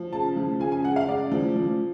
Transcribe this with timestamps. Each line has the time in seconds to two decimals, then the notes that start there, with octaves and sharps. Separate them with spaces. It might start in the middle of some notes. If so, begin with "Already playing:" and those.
Already playing: F3
0.12 C#3 A5
0.36 F3
0.60 C#3 G#5
0.72 G#5
0.84 G#3 F#5
0.96 F5
1.07 C#3 D5
1.32 F3
1.56 F3